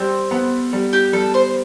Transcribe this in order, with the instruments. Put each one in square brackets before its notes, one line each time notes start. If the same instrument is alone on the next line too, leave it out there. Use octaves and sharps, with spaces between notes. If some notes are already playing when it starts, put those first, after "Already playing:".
Already playing: [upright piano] G3 [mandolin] C4
[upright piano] B3
G3
[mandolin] G4
[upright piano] G3 [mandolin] A4
[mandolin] C5